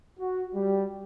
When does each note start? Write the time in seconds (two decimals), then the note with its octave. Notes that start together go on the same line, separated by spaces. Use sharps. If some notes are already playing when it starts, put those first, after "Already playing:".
0.20 F#4
0.54 G3